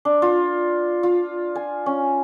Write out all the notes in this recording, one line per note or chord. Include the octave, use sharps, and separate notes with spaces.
D4
F4
F4
G#5
C#4